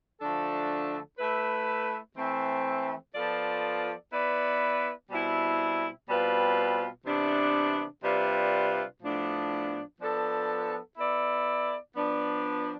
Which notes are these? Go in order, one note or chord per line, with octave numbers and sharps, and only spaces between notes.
D3 F3 A3 D4 A4
A3 E4 B4
E3 A3 C4
F3 B3 F4 A4 D5
B3 E4 B4 D5
B2 G3 C4 E4
B2 G3 C4 F4 B4
C3 E3 B3 D4
C3 G3 D4 F4 B4
A2 F3 B3 D4
F3 B3 D4 A4
B3 E4 A4 D5
F3 B3 D4